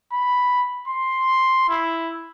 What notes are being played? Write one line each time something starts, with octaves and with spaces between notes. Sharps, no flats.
B5
C6
E4